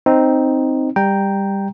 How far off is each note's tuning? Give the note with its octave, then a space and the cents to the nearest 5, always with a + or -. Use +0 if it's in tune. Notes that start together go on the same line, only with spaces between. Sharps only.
C4 +0 D#4 +0
G3 +15 G5 +0 A#5 +0